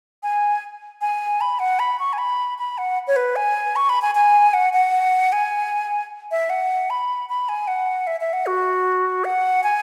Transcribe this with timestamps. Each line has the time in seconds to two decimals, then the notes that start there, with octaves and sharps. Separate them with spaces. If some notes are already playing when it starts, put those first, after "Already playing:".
0.23 G#5
1.01 G#5
1.41 B5
1.59 F#5
1.79 B5
1.99 C#6
2.13 G#5
2.18 B5
2.58 B5
2.78 F#5
3.07 C#5
3.16 B4
3.36 G#5
3.76 C#6
3.89 B5
4.02 G#5
4.15 G#5
4.54 F#5
4.73 F#5
5.32 G#5
6.31 E5
6.50 F#5
6.90 B5
7.29 B5
7.49 G#5
7.68 F#5
8.07 E5
8.20 E5
8.33 F#5
8.46 F#4
9.25 F#5
9.64 G#5